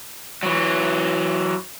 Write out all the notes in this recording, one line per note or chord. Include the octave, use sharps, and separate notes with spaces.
E3 F#3